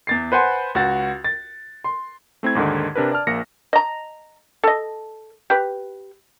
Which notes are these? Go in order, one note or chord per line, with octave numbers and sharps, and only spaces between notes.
E2 A6 C7
B4 C5 F#5 G#5 C6
C#2 F#4 A6
A6
C6
A3 C4 E4 G#6
D#2 G#2 D3 D#3
C3 D4 A#4 B4
D5 A5 F6
A#1 A#3 A#6 C#7
D#5 A#5
A4 D#5
G4 B4